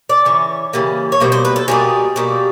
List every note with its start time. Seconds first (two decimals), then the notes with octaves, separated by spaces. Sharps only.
0.09 D5
0.25 C#3 E3 C#5
0.73 C#3 E3 G3 A#3
1.12 C#5
1.20 B2 G3 A#3 C5
1.32 C5
1.45 B4
1.56 A4
1.68 B2 G3 A#3 G#4
2.16 B2 G3 A#3